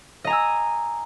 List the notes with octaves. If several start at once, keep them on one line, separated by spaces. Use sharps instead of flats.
D#5 G#5 A#5 E6